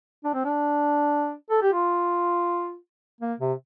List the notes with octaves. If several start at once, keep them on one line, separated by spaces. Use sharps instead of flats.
D4
C4
D4
A4
G4
F4
A#3
C3